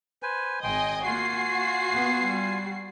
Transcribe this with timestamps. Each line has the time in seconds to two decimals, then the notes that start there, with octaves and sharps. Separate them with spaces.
0.23 B4 C5 G#5
0.63 G#1 D#5 G5 G#5 C6
1.06 A#3 F4 F#4 G#5 C7
1.90 A#3 B3
2.22 G3